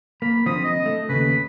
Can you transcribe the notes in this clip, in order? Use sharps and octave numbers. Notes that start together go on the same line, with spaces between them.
A#3 B5
D3 F3 C4 D#6
D#5
A3
D#2 C#3 B4